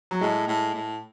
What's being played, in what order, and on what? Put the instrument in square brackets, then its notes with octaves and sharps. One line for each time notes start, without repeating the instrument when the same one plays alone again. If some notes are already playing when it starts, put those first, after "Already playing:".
[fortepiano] F#3
[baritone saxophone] A2 [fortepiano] G#3
[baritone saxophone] A2
A2